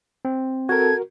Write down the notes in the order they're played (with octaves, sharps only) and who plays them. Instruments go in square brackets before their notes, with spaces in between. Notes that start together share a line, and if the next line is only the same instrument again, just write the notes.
[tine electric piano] C4
[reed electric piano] F#4 A#4 [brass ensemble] A4 [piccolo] G#6